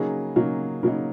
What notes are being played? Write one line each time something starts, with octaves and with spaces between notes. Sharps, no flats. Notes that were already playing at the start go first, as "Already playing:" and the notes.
Already playing: C#3 F#3 A#3 D#4 G#4
C#3 F#3 A#3 D#4
C#3 F#3 A#3 D#4 A#4